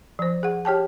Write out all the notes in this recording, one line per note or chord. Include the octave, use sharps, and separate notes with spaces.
F3 C5
G#4 F#5
G4 C#5 G5 A5